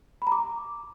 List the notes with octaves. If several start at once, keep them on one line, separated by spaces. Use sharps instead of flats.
B5
A#5
D6